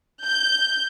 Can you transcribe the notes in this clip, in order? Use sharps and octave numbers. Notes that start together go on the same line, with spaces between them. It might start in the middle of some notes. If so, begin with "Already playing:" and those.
G6